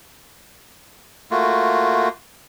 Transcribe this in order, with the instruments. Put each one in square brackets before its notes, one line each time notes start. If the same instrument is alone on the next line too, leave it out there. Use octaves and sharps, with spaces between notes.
[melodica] A3 A#3 F4 F#4